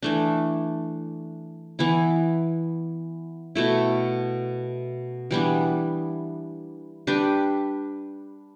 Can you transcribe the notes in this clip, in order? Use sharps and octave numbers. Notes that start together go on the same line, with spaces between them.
E3 A3 D4
E3 B3 E4
B2 A3 E4
E3 G3 B3 D4
G3 D4 G4 B4